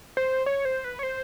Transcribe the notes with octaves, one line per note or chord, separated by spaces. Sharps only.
C5
C#5
C5
B4
C#5
C5